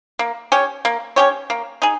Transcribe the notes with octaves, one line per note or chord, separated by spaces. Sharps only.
A#3
C#4 G4 C#5
A#3
C#4 G4 C#5
A#3
D#4 G#4